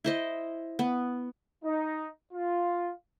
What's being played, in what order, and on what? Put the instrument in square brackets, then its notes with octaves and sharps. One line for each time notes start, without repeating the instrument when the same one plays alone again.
[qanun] E4 C5 D#5
B3
[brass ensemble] D#4
F4